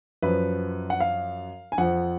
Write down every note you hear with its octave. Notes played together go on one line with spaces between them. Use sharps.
F#2 F3 B4
F#5
F5
G#5
F2 F3 F#5